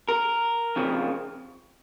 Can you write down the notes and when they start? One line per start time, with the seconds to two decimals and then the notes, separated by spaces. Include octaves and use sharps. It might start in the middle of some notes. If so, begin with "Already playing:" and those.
0.09 A#4
0.76 F2 C#3 F3